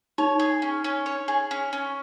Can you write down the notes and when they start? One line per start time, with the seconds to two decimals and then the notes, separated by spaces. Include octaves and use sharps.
0.18 D#4 C#5
0.40 G#4
0.62 C#4
0.84 C#4
1.06 C#5
1.28 G#4
1.51 C#4
1.73 C#4